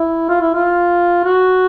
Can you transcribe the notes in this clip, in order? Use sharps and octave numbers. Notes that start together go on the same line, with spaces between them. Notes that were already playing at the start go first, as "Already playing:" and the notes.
Already playing: E4
F4
E4
F4
F#4